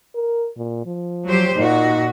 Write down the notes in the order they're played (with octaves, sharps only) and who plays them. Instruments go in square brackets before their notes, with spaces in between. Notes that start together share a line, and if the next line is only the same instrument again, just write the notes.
[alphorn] A#4
A#2
F3
[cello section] F#3 G4 C5
[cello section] A#2 F#4 [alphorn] D#4